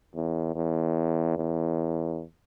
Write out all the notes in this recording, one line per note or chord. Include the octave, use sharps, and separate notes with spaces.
E2
E2
E2